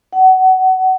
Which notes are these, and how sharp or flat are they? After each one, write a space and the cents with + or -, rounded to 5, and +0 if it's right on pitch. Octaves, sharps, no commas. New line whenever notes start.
F#5 +25